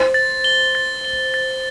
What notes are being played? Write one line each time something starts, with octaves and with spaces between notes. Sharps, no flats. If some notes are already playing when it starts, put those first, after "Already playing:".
Already playing: C5
A6
G7
A6
G7
A6